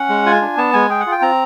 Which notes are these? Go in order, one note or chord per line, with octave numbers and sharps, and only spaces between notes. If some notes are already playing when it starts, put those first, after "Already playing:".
Already playing: C#4 F#5
G#3
F4 G#5
D4
B3 A5
G#3 G#5
G#4 G5
F#5
F4
G5
C4 A#5